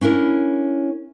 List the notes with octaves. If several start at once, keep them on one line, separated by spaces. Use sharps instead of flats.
C#4 D4 E4 A#4